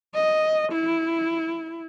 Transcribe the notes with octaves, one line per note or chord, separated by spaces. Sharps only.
D#5
E4